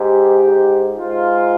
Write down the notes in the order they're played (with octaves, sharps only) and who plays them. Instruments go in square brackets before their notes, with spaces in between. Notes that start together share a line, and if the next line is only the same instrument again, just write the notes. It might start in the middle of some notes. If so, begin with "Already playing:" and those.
Already playing: [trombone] G#2 [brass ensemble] G4
[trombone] G#2
[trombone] G#2 [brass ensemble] F4